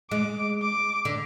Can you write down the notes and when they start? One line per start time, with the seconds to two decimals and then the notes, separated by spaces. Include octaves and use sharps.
0.11 G#3 D6
0.62 D6
1.05 D3